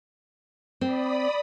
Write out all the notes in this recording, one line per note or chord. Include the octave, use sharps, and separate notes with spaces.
C4 D5 B5 D#6